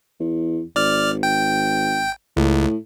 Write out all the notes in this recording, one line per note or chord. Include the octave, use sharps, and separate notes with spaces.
E2
G#1 D5 F6
G5
C#2 A2